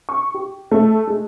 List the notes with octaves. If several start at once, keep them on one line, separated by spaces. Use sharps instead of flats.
C#6
G4
A3
G#3